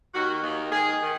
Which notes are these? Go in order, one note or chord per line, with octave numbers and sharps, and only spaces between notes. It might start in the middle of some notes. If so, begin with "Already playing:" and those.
D#2 D#3 F#4
D#2 D#3
G#2 D#3 G#4
D#3